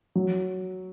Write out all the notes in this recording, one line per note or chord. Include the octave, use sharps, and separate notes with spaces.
F#3